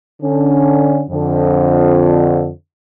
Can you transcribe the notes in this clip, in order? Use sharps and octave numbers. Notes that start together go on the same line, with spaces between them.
D3 C#4
F2 D3